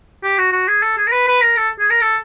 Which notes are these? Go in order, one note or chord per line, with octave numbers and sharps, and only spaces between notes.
G4
F#4
F#4
G#4
A4
G#4
A#4
B4
B4
A#4
A4
G#4
A#4
A4